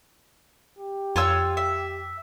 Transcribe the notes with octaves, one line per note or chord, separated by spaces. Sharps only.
G4
F2 F4 C#5 E6
E5